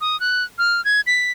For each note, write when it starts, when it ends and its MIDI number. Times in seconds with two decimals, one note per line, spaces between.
0.01 0.19 87
0.20 0.44 90
0.58 0.84 89
0.85 1.01 92
1.07 1.32 95